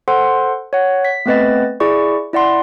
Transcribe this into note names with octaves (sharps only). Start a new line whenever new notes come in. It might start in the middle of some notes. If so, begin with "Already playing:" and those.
A4 C5 F#5 C6
C#5 F#5
B6
A3 B3 C4 B4 D#5 A6
E4 G#4 D5 C#6
E4 D5 F#5 C6